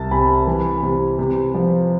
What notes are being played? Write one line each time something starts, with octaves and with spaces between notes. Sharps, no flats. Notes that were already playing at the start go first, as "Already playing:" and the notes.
Already playing: C2 A5
C3 G#5 B5
E3
C3
C3
F3